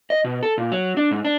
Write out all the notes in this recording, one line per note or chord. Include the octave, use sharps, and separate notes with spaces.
D#5
B2
A4
A#2
F#3
D4
G#2
D4